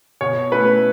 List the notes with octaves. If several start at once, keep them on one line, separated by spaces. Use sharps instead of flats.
B2 C#5
A3 C#4 E4 B4